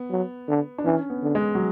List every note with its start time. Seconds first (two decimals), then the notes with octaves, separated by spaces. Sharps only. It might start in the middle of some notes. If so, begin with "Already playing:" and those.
Already playing: B3
0.11 F#3
0.48 D3
0.78 D4
0.85 E3 C#4
1.10 B3
1.23 D3
1.35 G#3
1.55 F#3